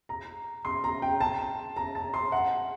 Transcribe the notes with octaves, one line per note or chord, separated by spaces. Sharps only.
A#5
C6
A#5
G5
A5
A#5
A5
C6
F#5